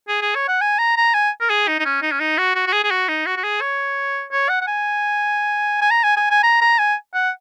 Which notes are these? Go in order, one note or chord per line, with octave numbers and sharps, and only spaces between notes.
G#4
G#4
C#5
F#5
G#5
A#5
A#5
G#5
A#4
G#4
D#4
D#4
C#4
D#4
C#4
D#4
F#4
F#4
F#4
G#4
G#4
F#4
D#4
F#4
F#4
G#4
C#5
C#5
F#5
F#5
G#5
G#5
A#5
G#5
G#5
G#5
A#5
A#5
G#5
F#5